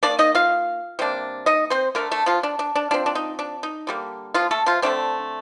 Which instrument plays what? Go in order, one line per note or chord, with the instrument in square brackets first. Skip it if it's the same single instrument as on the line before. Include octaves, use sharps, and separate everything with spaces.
[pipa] D#3 A#3 D4 D5
D#4 D#5
F4 F5
C3 G3 A#3 D4
D#4 D#5
C4 C5
D3 A3 A#3 D4 A#4
A3 A4
F3 F4
D4
D4
D4
F3 C4 D4
D4
D#4
D4
D#4
D3 G3 A#3
F3 F4
A3 A4
F3 F4
D3 A3 C4 D4